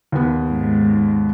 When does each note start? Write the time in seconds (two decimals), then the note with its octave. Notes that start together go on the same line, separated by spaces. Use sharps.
0.12 D#2 B3
0.49 G#2